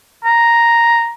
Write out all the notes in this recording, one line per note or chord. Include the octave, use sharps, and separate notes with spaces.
A#5